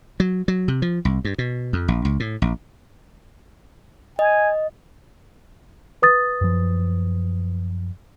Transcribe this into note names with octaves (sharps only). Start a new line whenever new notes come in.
F#3
F#3
C3
F3
C2
G2
B2
F2
A#1
C#2
A2
A#1
D#5 G#5
B4 D#6 A6
F#2 F3